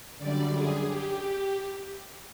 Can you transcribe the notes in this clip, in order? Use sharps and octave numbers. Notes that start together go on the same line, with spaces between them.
F#2 D3 G3 D5
G#4
G4